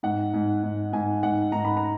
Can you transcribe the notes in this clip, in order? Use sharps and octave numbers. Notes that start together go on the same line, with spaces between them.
G#2 F#5
G#2
G#2
G#2 G#5
G#2 F#5
G#2 A#5
B5
A#5